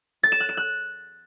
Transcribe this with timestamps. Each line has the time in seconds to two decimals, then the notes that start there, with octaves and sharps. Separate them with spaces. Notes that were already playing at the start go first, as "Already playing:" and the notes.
0.23 A6
0.32 E7
0.40 F#6
0.49 E7
0.57 F#6